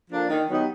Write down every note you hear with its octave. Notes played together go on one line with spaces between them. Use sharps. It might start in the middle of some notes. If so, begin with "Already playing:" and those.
F3 A#3 D4
D#3
F#3 B3 D#4 G4